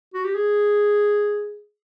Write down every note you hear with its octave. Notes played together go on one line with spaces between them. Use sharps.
F#4
G4
G#4